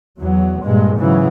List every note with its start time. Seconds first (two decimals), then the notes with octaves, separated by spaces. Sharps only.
0.19 E2 F#3
0.63 G2 A#2 G#3
0.97 G#2 C#3 E3 F#3